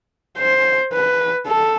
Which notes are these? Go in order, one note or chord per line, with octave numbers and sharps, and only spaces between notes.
C5
B4
A4